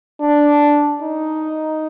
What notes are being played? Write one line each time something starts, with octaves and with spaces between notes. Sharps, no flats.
D4
D#4